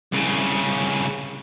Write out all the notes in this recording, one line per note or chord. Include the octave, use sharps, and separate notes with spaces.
C2 C#3